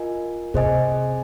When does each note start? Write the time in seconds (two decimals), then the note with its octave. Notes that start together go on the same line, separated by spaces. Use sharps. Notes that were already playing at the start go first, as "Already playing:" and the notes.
Already playing: F4 A#4 D#5 G#5
0.54 C3 G#4 C5 D#5 G#5